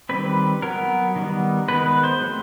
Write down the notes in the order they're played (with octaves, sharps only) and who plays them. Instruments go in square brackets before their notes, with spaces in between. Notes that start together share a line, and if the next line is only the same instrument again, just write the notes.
[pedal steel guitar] D#3 G3 C4 B4
F#3 B3 A#4
D#3 G3 B3
D#3 G#3 B3 B4
B4
C5
F#3 A3 C4